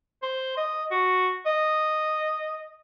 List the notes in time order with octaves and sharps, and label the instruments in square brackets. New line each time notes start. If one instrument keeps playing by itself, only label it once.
[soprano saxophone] C5
D#5
F#4
D#5